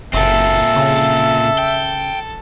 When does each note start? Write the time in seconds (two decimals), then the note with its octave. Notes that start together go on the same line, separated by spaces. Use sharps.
0.13 F#1 A#2 C4 A4 E5
0.76 C#3
1.58 G5